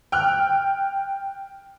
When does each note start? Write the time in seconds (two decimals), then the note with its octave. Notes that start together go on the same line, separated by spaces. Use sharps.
0.12 G5 F6 F#6